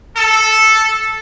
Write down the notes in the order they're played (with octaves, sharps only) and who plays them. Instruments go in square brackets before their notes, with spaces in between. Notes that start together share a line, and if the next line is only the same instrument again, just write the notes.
[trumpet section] A4